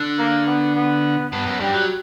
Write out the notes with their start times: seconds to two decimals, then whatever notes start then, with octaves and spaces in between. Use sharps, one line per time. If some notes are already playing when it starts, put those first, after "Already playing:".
Already playing: D3
0.19 A#3
0.46 B3
0.75 B3
1.33 G2 B3
1.47 F#2
1.60 G2 G3
1.74 F#3